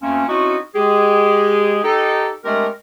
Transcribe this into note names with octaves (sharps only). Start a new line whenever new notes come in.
D2 A3 A#3 C4 C#4
C4 C#4 D#4 E4 F#4
G#3 G4 G#4
D#4 G4 A4
G#3 A3 C4 D4 G4 A#4